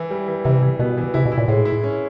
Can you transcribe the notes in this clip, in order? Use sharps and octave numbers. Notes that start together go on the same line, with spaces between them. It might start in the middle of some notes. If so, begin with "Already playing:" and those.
Already playing: E3 E4
G3
E3
C3 E3
E3
B2 B3
E3
C3 E4
B2
E4
A#2
A2 G#3
E4
C#4